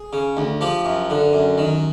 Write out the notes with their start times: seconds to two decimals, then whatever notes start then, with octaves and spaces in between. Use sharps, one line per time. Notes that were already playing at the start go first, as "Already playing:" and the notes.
Already playing: G#4
0.13 C#3
0.37 D2
0.61 F3 G4
0.85 F#2
1.10 D3
1.33 F#2
1.58 D#3